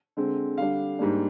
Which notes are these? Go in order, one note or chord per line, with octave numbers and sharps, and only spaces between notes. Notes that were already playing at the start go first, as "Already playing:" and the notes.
D3 G#3 C4
D3 G3 D4 F5
G#2 G3 A#3 D4